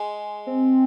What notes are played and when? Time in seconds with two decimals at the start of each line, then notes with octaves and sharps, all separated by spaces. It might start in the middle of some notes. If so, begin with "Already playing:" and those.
Already playing: G#3
0.47 C4